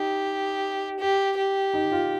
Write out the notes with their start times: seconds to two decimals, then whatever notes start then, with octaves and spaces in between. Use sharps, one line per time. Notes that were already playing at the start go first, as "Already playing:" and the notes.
Already playing: D#4 G4
1.00 G4
1.37 G4
1.74 D#4
1.92 F4